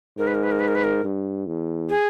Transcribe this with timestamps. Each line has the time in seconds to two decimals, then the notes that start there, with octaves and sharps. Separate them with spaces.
0.18 G#2 A#4
0.27 B4
0.34 A#4
0.43 B4
0.51 A#4
0.60 B4
0.68 A#4
0.75 B4
0.84 A#4
1.04 G2
1.47 E2
1.89 G#4